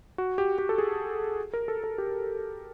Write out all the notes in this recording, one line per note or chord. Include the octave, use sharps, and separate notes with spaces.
F#4
G4
G4
A4
G#4
A#4
A4
A4
G4